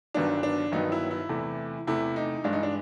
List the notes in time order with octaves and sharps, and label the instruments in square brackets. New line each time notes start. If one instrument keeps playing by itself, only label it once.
[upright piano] G1 G2 D#3 F#3 B3 D4
D4
G1 G2 D#3 F#3 B3 D#4
E4
E4
E2 C3 E3 A3
E2 C3 E3 A3 E4
D#4
G2 E3 G#3 D4
D#4
D4